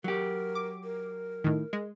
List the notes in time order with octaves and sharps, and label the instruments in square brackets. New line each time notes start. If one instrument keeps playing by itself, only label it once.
[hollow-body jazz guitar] F#3 G4 [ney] A#4
[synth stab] D6
[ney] A#4
[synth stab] A2 D#3
G#3